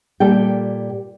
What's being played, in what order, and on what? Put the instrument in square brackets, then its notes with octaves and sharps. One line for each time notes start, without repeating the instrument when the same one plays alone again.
[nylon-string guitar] A#2 G3 A4 G5